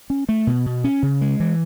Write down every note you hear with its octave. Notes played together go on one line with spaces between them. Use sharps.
C#4
A3
B2
B2
C#4
C#3
G#3
E3